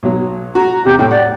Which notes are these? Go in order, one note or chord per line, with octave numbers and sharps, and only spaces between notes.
B1 F#3
F#4 A#5
E2 C3 G4
A2 G5
D5 F#5